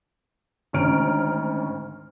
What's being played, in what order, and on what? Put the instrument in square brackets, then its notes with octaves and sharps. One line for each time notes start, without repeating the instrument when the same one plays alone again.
[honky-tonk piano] G#1 D2 C#4 A#5 F6 D7